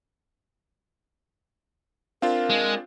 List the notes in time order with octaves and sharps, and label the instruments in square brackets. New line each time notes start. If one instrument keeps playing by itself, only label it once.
[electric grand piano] C4 D4 F4 [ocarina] A#4 [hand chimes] F5
[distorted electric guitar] G#3